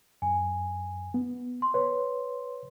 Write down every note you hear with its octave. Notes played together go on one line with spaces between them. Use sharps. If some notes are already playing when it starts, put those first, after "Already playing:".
F#2 G#5
B3
C6
B4 C#5